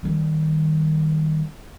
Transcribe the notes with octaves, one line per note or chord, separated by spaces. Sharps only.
D#3 G3